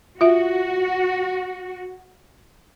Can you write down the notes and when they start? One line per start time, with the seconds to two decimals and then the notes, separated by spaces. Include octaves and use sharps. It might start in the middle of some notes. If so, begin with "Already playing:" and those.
0.21 F4 F#4 E5